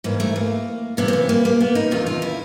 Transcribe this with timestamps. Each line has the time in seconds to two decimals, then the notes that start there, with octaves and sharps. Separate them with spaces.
0.04 G#2 E3 A#3
0.20 A3
0.36 A#3
0.97 F2 C3 E3 B3
1.08 C4
1.13 B3
1.29 A#3
1.45 A#3
1.60 B3
1.75 D#4
1.91 E2 C3 D#3 F4
2.07 F4
2.22 E4